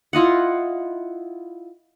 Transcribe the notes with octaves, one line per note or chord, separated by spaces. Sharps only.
E4 F4 D#5 F#5